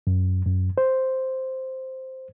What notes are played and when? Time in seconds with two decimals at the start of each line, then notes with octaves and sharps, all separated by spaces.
0.07 F#2
0.46 F#2
0.78 C5